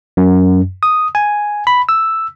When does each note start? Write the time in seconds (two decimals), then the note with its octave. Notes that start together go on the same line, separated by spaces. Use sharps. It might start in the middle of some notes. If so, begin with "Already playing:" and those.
0.17 F#2
0.83 D#6
1.15 G#5
1.67 B5
1.89 E6